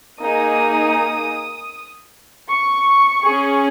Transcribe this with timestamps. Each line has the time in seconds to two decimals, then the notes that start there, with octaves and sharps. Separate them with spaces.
0.21 A#3 D#4 G#4 D#6
2.49 C#6
3.25 C#4 G#4